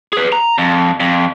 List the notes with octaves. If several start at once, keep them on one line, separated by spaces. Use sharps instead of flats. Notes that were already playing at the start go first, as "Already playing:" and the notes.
G#4 B4
A#5
F2
F2